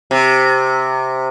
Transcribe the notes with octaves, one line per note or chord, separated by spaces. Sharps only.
C3